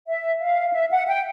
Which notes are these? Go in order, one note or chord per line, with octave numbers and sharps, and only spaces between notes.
E5
F5
E5
F#5
G5